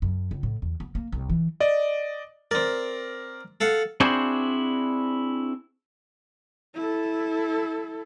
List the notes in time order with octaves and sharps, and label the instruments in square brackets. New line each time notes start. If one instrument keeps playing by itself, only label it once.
[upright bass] F#2
C#2
A2
E2
B3
A#3
C2
E3
[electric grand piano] D5 D#5
[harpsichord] C4 D5 [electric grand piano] A#4
[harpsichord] A4 F5 F#5
[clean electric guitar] C4 D4 E4 F#4 G#4 C5
[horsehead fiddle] E4 A4